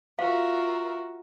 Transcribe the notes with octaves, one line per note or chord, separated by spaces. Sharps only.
F4 F#4 A#4 E5 F5